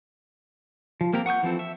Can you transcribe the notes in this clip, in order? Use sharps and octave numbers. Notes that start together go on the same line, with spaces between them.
F3
A#3 C4 G4 A#4
F#5 C#6 D#6 G6
E3 F3 C4 A4
E5